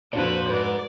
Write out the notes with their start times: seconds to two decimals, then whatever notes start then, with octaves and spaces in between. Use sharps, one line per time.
0.13 F2 A#2 D4 F#4 B4 C5
0.49 G#2 B4 D5